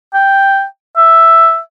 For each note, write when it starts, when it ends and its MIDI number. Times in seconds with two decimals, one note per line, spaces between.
0.14 0.65 79
0.97 1.59 76